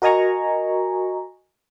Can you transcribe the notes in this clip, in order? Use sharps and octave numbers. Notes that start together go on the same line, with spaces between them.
F#4 A#4 D#5 G#5 A#5 C#6